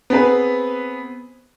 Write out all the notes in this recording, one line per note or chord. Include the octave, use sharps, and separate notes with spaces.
B3 C4 G#4 B4